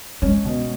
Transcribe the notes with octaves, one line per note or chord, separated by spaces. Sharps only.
G#3 C#4
B2